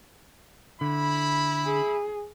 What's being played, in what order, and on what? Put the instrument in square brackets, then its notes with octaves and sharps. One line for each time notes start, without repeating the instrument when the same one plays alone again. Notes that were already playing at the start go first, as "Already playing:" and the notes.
[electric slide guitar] D3 [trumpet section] E4 B5
[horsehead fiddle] G#4